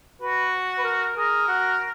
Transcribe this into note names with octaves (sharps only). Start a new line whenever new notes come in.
F#4 B4
B4
A#4
G#4 A#4
F#4